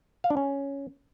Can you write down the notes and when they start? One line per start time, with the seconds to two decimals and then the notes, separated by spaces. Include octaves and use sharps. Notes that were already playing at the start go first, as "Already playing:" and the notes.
0.24 F5
0.30 D4
0.37 C#4